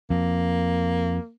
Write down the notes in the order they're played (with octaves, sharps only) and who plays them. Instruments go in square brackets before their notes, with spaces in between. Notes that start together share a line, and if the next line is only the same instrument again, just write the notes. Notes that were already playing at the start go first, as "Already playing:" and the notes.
[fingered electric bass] F2 [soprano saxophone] A#3